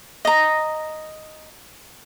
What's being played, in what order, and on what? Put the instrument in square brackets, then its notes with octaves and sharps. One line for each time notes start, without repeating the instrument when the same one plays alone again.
[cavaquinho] D#5 A#5